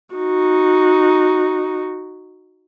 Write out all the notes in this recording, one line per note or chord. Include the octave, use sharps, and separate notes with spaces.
D#4 F#4